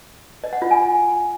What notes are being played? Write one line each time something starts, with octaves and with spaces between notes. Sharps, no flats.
D#5
F#5
F4
G#5